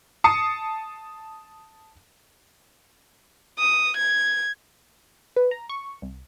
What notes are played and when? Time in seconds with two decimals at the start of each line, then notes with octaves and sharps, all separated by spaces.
0.24 A5 D#6 C7 C#7
3.59 D#6
3.97 G#6
5.36 B4
5.51 A#5
5.69 C#6
6.02 C2